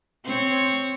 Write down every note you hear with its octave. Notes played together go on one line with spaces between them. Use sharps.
C4 C5 C#5